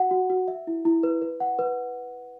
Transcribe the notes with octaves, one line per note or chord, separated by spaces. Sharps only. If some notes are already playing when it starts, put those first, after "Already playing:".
Already playing: F#4 F#5
F#4
F#4
E5
E4
E4
B4
B4
F#5
B4